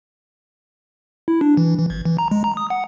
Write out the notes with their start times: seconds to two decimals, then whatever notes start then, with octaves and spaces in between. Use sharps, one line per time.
1.28 E4
1.41 D4
1.57 E3
1.78 E3
1.90 G#1
2.05 E3
2.19 A#5
2.31 G#3
2.44 A#5
2.57 D#6
2.70 F#5